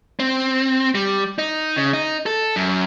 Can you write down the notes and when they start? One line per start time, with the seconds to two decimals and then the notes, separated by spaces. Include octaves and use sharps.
0.20 C4
0.95 G3
1.39 D#4
1.76 C#3
1.93 D#4
2.26 A4
2.56 F#2